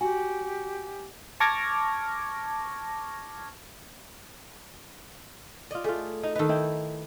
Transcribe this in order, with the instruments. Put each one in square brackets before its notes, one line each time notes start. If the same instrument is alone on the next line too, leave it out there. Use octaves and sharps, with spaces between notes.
[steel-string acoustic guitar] F#4 [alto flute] G4 [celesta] G#5
[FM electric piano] A5 C#6 D6 F6 G#6 A#6
[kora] F4 D5 [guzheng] D#5
[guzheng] A3 [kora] F4 G#4
[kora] D#4
[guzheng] D#3 B4 [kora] D#4 A4
[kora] D#4 E4 G5